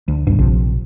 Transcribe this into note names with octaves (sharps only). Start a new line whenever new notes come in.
D2
G#1 D2 G2 B2
A#1 C3 F3